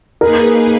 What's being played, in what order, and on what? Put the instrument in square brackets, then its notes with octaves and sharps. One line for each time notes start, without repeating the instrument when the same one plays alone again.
[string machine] A#3 D#4 G#4 B4 [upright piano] A#4